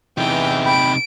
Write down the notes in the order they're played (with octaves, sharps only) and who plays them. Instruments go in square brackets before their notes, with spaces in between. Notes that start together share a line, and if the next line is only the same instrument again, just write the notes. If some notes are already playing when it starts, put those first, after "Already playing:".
[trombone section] E2 E3 [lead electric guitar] C3 D#4 [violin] G5
[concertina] G5 B5 [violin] D7